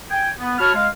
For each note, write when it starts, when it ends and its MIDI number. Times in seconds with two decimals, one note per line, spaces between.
0.11 0.30 79
0.11 0.30 80
0.40 0.58 59
0.59 0.73 66
0.59 0.73 73
0.59 0.73 81
0.59 0.73 83
0.59 0.73 89
0.75 0.87 56
0.75 0.87 77